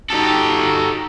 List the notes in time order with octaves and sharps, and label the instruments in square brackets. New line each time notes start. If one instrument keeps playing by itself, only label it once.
[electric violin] D#4 F#4 [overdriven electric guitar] G4 A4